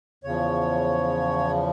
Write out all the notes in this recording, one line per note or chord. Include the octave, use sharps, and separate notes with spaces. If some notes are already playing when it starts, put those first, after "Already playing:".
E2 C#3 F3 C#5